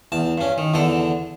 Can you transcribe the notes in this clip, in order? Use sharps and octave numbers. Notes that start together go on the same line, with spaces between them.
E2 A5
G2 C#4
D#3
E2 D3 A4